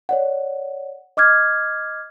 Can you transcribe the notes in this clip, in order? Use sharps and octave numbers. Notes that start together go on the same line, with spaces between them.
C#5 D5 F#5
D#5 D6 F6 G#6